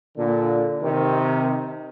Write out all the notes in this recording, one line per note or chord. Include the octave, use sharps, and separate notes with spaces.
A#2 D3
C3 D#3